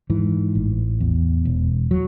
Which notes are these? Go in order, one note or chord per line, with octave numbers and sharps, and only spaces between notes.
G#2 E3
A1
E2
E1
F#3